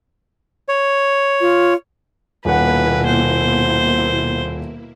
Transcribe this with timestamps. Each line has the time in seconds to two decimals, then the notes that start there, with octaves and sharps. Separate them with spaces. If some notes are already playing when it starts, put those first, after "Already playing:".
0.69 C#5
1.41 F4
2.45 D#1 B2 A#3 E4 B4 F#5
3.06 C5